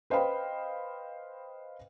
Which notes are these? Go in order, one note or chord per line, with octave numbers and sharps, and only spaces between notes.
B4 C5 D#5 F5 G5 B5